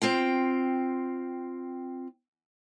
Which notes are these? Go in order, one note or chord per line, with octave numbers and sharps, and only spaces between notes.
C4 F4 G5